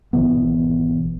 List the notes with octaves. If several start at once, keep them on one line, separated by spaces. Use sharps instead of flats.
G#1 B2 E3 B3